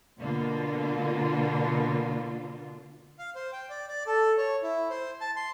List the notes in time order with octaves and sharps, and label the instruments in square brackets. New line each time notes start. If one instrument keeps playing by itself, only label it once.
[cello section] B2 D3 A#3 F4
[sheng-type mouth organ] F5
C5
G5
D5
D5
A4
C#5
E4
C5
A5
C6